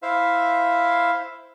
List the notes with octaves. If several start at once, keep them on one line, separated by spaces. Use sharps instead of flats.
E4 C5 E5 F5